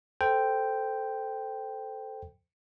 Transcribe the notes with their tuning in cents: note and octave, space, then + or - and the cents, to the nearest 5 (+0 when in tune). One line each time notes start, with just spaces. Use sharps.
A4 +0 C5 -15 G5 +0